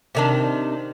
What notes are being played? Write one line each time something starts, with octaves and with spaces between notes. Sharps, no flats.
C3 D#3 D4